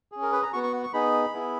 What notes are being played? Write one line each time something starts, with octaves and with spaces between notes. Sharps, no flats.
C#4 G#4
A#4
B4
A#5
B3 F#4 C#6
C#6
F#5
C#6
B3 D#4 G#4 B5
B3 E4 G#4